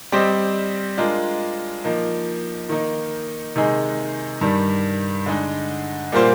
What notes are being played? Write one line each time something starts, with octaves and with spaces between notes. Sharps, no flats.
G3 C4 G4 C5 D#5
G#3 D4 F4 A#4
F3 A#3 D#4
D#3 A#3 D#4
C3 D#3 G#3 D#4 G#4
G2 D#3 G3
D3 G#3 D#4
A#2 G3 A#3 F4 C5